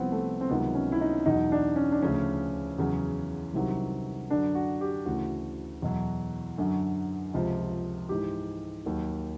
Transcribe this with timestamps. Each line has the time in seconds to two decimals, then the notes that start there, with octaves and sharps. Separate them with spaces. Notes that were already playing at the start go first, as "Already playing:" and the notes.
Already playing: C2 C3 F3 B3 C4
0.12 A3
0.41 C4
0.50 C#2 C3 D#3 F#3 B3
0.75 C#4
0.92 E4
1.01 D#4
1.26 E2 B2 F#3 D#4
1.52 D4
1.76 C#4
1.92 D4
2.02 D2 C#3 F3 C#4
2.78 E2 C#3 F#3
3.54 C2 C3 D#3 F#3
4.30 F#2 D3 F#3 D4
4.55 F#4
4.81 G4
5.05 D2 C#3 E3 F#4
5.82 E2 B2 F#3
6.58 F#2 D3 F#3
7.34 C#2 C3 F3
8.09 G#2 E3 G4
8.85 D#2 D#3 F#3